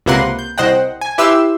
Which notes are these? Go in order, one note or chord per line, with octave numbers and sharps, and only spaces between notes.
C#2 C3 A#3 B4 F#5 C6
G6
C2 C5 D#5 F#5 G5
G#5
E4 G4 B4 E5 C6 E6